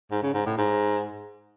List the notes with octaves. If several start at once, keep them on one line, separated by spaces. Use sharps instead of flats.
G#2
C#3
G#2
A2
G#2